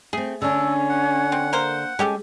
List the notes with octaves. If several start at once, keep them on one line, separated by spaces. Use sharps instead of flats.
A3 C4 G#4
D3 C#4 D4 A4
F#5
C4
A#3 A#4 C5
G#3 C#4 G4 A4